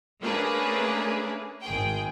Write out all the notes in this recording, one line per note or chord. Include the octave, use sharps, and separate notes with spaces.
A3 A#3 C#4 D4 G#4 B4
G#1 G#4 G5